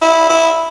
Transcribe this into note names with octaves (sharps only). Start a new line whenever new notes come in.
E4
E4